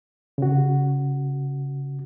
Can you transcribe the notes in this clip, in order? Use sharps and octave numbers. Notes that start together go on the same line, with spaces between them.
C#3 F#4